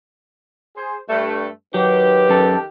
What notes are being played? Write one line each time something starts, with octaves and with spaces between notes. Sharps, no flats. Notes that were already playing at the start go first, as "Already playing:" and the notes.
G#4 C5
G2 A3
D#3 F#3 G4 B4
F#2 A4